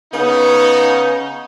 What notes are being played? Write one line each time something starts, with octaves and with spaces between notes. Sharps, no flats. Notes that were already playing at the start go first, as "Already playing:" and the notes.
C#3 B3 D#4